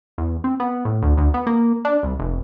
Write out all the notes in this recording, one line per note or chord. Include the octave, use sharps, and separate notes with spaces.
E2
C4
B3
A2
D2
D2
B3
A#3
D4
C2
F1